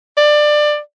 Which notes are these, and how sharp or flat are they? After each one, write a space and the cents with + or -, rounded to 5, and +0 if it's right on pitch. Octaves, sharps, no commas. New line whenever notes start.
D5 +20